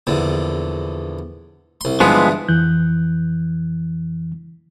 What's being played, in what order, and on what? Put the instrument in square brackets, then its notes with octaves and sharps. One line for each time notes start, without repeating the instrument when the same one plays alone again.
[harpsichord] A#1 E2 D3
C2 C6
[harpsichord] G2 D3 E3 [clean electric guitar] F3 G#3 B3
[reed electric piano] F2 E3 F#6 G6